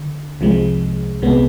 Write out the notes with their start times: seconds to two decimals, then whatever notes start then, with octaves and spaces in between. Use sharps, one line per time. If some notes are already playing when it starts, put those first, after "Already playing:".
Already playing: D3
0.40 C2 C3 F3 G#3
1.22 C2 C3 G#3 B3